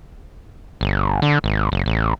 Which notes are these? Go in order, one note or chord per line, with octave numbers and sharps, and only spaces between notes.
G1
D3
G#1
F#1
A1